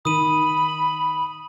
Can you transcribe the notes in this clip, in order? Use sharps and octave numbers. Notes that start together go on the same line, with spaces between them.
D#3 B5 D#6 D#7